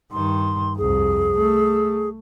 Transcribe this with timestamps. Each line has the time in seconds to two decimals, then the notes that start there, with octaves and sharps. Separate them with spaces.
0.12 G2 D#3 C6
0.78 C2 F2 G#4
1.38 A3